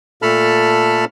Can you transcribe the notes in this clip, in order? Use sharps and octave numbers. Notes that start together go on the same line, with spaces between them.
A#2 A3 A4 A5 B5 F6